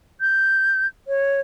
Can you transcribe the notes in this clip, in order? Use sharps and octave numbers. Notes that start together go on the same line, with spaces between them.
G6
C#5